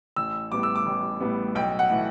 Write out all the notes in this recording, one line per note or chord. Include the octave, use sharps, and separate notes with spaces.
A1 E6
A2 G3 B3 D6
E6
D6
A1
A2 G3 B3
B1 G5
F#5
A2 E3 A3